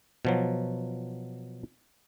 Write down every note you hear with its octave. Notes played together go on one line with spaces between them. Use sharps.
B2 F3 F#3